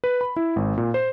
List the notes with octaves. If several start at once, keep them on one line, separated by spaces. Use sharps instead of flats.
B4
B5
E4
G#1
A#2
C5